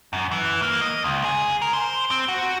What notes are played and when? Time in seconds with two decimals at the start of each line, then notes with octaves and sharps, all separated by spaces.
0.13 F#2
0.31 E3
0.62 A#3
0.81 D#5
1.04 C#2
1.25 G#4
1.62 A#4
1.73 C5
2.11 C4
2.28 F#4